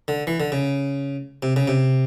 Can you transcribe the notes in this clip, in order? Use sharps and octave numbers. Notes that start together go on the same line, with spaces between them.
D3
E3
D3
C#3
C3
C#3
C3